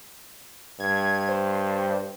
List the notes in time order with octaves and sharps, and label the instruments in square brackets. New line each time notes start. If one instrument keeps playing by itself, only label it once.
[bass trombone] G2 [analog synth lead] G#6
[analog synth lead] C5